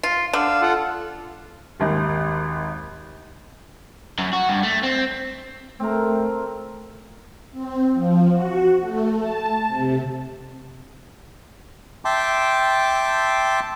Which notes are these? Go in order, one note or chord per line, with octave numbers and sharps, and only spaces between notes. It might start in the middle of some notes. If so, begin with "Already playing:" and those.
F4
D3 F5 E6
F4 A4 F#5
G#1 D#2
F#2
F#4
G2
A3
C4
A3 C4 A#4
C4
F3
F#4
A3
A5
C3
E5 G5 A5 C6 D6